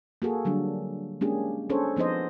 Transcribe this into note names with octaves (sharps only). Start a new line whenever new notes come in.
A#3 F#4 G#4 A4
D3 F#3 G3 D4
G#3 A#3 C#4 D4 G4 G#4
C#4 D4 G#4 A4 C5 C#5
F3 B3 D#4 C5 D#5